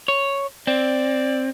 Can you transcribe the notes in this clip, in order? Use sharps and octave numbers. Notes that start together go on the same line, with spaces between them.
C#5
C4 D5